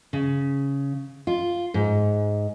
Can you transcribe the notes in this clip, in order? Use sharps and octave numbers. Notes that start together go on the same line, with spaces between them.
C#3
F4
G#2